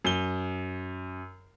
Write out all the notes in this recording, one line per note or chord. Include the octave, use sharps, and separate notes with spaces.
F#2 G7